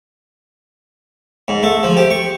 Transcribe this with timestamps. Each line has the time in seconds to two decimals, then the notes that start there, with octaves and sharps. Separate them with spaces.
1.48 G#2
1.63 A3
1.83 F3
1.97 G4
2.10 C#6